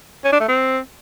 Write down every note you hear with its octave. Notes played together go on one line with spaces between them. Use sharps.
C#4
D4
A3
C4